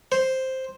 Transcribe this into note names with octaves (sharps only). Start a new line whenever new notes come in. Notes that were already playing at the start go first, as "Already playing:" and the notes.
C5